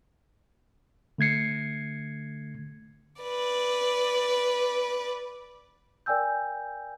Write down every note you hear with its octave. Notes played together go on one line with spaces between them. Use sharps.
D3 A3 G#6 C7 C#7
B4 D5
A#4 D5 G5 G#5 E6 G6